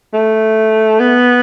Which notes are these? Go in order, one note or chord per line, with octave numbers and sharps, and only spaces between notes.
A3
B3